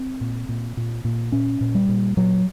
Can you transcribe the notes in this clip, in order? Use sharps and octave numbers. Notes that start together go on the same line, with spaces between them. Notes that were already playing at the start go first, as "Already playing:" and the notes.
Already playing: C4
A#2
A#2
A#2
A#2
A#2 C#4
A#2
G3
A#2
A#2 F#3